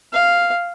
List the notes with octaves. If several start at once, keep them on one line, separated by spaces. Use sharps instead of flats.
F5